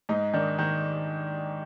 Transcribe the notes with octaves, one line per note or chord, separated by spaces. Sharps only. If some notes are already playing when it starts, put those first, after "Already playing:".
G#2 D#4
D#3 D4
D#3